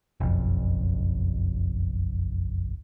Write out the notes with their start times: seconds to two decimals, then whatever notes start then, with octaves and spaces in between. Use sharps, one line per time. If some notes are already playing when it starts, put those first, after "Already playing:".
0.20 F#1 B1 F2